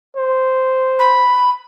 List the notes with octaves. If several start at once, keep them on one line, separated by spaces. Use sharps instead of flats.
C5
B5